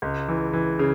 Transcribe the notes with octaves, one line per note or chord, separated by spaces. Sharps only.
C#2
E3
E3
C#3